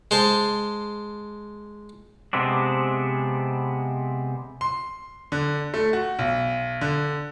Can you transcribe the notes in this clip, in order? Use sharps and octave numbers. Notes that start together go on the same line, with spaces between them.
G#3 C5 A5
C3 G#3 B3 C4 D4
C6
D3
A3
F#4
B1
D3